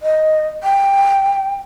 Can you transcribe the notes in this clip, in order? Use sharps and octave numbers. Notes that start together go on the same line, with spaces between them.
D#5
G5